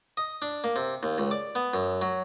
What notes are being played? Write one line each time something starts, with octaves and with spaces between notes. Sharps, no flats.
D#5
D4
A#3
C3
D#2
C#2
D5
B3
F#2
F#3